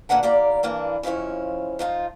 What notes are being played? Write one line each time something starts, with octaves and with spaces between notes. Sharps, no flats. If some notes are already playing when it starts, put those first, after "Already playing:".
A#2 D3 A#3 B4 F#5 A5
E2 A#3 G4 D5 A#5
G2 E3 A#3 D4
F2 C#3 F3 E4 C#5
F3 D#4 F4